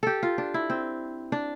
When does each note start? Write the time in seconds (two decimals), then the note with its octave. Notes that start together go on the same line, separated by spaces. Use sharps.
0.03 G4 A4
0.23 F4
0.38 D4
0.54 E4
0.70 C4
1.32 D4